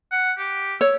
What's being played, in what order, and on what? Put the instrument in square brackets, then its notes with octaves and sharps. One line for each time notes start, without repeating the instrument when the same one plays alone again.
[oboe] F#5
G4
[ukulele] C#5 [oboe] E6